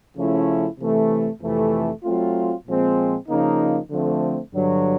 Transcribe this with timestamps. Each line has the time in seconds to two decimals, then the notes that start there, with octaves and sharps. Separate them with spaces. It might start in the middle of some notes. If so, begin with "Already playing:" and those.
0.17 C#3 F3 A3 C#4 E4
0.79 C3 E3 A3
1.42 F2 C3 E3 A3
2.04 F#3 A3 C4 F4
2.67 A#2 F3 G#3 C4
3.28 C#3 F3 A#3 D#4
3.90 D3 F3 A3 C4
4.53 G2 D3 F#3